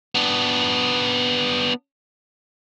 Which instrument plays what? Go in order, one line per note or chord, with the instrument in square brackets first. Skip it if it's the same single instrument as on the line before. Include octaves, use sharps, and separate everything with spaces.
[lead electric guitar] B3 D4